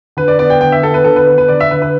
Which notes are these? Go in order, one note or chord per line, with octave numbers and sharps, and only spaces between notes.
D3 B4
D5
B3 D5
G5
D3 G5
E5
B3 A4
B4
D3 A4
B4
B3 B4
B4
D3 D5
E5
D3 B4
B4